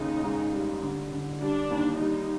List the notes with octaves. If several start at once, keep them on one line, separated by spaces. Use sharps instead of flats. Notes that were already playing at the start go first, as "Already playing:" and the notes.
Already playing: D#2 C#3 D#4
G#2
G3
D3
D3
G3 D4
D#2
G3 D#4